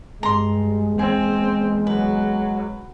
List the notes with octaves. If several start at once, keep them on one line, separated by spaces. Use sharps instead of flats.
G2 G#3 A#5 C6
E2 C4 G#4
F#3 B4